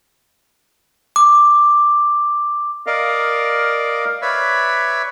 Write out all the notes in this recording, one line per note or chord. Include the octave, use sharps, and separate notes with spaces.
D6
A#4 D5 D#5 F5
B4 C#5 D5 E5